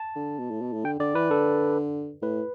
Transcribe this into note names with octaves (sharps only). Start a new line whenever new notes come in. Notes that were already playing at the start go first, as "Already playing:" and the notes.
Already playing: A5
D3
B2
A2
B2
A2
D3 G5
D3 D5
E3 B4
D3 A4
A2 B4